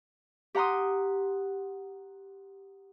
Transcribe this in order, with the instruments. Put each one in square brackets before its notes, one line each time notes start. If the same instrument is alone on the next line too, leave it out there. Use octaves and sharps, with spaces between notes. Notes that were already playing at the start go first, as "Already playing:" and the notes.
[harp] G4 F#5 A#5 C6 D#6